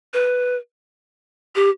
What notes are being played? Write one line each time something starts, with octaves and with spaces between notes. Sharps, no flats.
B4
G4